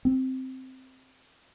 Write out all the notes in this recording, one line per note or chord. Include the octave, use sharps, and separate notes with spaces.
C4